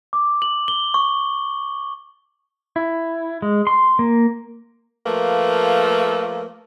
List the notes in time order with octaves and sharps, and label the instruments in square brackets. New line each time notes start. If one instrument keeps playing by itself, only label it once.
[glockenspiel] D6
F#7
G7
C#6
[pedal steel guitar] E4
G#3
C6
A#3
[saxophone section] F3 A3 A#3 B4